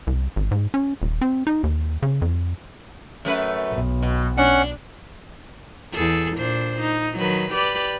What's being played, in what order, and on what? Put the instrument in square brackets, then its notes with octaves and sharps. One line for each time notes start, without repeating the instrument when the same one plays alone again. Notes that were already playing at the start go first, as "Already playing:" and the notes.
[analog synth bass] C2
G#1
G#2
C#4
D#1
C4
D#4
D#2
C#3
F2
[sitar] F#2 A3 B4
[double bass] B1
[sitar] B2
[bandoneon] C#4 F#5 [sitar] D4
[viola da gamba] E2 G#4 A4
A#2 D4 C5
D#4
D#3 F#3 B4
G4 B4 D5